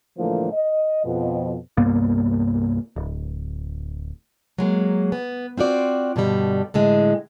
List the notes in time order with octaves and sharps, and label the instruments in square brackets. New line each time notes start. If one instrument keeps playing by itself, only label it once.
[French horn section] A2 D3 E3 F3 A3 A#3
D#5
F2 B2
[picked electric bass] C2 G2 A#3 B3
D1
[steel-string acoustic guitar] F#3 G#3 A#3
B3
C4 F4 F#4 D5
G2 B2 D3 G3
A2 D3 G#3